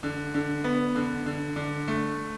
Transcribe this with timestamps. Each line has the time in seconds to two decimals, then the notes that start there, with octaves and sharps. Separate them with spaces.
0.03 D3
0.34 D3
0.64 B3
0.95 D3
1.26 D3
1.56 D3
1.88 A3